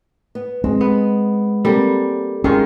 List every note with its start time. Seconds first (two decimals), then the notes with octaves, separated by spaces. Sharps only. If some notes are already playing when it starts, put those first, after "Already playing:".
0.35 B3
0.64 G#3 C4
0.81 B3
1.65 G3 A#3 C4 A4
2.44 D#3 G#3 C#4 F4